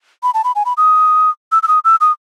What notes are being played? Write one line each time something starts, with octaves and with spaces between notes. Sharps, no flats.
B5
A5
B5
G#5
B5
D#6
E6
E6
D#6
E6
D#6